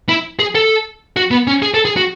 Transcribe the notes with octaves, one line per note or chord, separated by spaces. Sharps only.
E4
G#4
A4
F#4
B3
C#4
G#4
A4
G#4
F#4